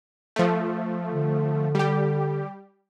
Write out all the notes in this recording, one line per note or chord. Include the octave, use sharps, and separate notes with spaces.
F3 A3
D3
G3 G4